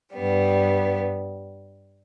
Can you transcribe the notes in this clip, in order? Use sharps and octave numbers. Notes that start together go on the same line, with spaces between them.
G2 G3 B3